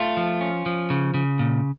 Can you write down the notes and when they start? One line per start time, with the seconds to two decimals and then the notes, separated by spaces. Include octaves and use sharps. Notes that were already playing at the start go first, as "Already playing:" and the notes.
Already playing: A3 F4
0.17 F3
0.41 C#4
0.66 F3
0.90 C#3
1.14 C#3
1.39 A#2